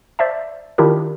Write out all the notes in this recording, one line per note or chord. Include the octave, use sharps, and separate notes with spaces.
C5 D5 E5 F5 A5
D#3 D4 E4 F4 G4 A#4